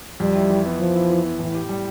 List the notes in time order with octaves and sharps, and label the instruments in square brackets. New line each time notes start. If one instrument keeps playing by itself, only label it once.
[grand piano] F2 [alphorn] G3
[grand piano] E4
E3
B3
[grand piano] F2 [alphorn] F3
[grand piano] E4
E3
B3
[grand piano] A2 [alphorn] E3
[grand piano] G4
G3